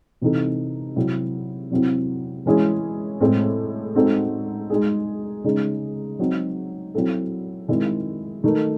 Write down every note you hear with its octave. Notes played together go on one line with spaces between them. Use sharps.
C3 E3 C4 D#4 A4
C3 F#3 C4 E4
C3 F#3 C4 E4
E3 G#3 C#4 E4 G#4
A2 G#3 C4
G#3 C4 D#4 F#4 A4
G#3 D#4 G#4
C#3 G#3 D#4 G#4
F#3 C4 D#4
F#3 C4 E4 A4
D#3 G#3 C4 E4
D#3 A3 D#4